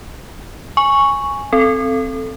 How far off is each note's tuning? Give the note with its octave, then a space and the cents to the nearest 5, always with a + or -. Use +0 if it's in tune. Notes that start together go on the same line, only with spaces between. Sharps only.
G#5 +0 C#6 +0
C4 +0 A4 +0